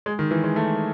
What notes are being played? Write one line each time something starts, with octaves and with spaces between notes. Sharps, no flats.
G#3
D#3
E3
G#3
A3